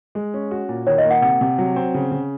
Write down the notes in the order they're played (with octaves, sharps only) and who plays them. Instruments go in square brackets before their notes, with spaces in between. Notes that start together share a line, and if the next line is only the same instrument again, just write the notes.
[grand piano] G#3
C#4
F#4
A#2
[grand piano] D#3 [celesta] C#5
[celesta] D#5
[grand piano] A#3
[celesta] F#5
[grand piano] C3 [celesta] F#5
[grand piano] C3
F#3
C4
C#3
C#3